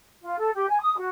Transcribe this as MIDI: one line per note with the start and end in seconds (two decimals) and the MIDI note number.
0.22 0.38 65
0.38 0.50 69
0.54 0.66 67
0.68 0.79 80
0.80 0.96 87
0.97 1.09 66